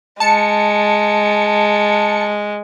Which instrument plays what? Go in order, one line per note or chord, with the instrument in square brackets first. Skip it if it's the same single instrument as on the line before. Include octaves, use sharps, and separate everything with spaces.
[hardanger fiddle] G#3 [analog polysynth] A5 C#7